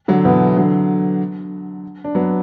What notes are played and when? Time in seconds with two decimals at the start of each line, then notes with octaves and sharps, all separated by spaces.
0.08 D3 F#3
0.25 B2 E3
0.56 D3 F#3
2.04 D4
2.15 F#3 B3